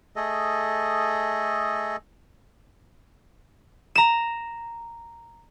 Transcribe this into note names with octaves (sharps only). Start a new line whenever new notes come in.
A3 G#4 A4 D#5
A#5 E7